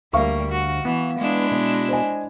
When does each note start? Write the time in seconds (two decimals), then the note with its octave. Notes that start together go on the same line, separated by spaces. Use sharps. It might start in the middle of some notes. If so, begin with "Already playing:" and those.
0.13 D2 G3 A#3 E5 F5 C#6
0.51 F#4
0.85 E3 B3
1.19 G#3 D4 E4
1.52 B2
1.89 C5 D#5 G#5